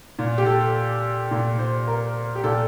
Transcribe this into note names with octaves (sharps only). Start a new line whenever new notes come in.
A#2
G4
A4
A#2
C5
A#4
G4
A#2 A4